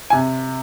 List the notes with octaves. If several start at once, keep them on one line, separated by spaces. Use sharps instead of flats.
C3 G#5